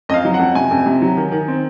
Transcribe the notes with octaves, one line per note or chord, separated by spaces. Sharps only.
F2 D#5 F5
F#3
F2 F#5
C3 G#5
F2
C3
F#3
D#3
D#3
C4